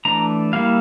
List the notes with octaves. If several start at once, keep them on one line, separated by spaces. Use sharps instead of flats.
E3 A3 D4 A#5
G3 A#3 E4 F5